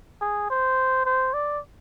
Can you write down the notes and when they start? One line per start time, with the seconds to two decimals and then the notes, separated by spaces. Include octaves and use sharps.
0.21 G#4
0.50 C5
1.05 C5
1.34 D5